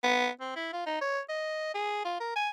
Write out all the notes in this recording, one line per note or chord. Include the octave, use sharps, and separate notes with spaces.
B3
C4
E4
F4
D#4
C#5
D#5
G#4
F4
A#4
G#5